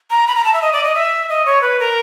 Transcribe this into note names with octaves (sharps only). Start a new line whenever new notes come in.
A#5
B5
A#5
A5
E5
D#5
D5
D#5
E5
D#5
C#5
B4
A#4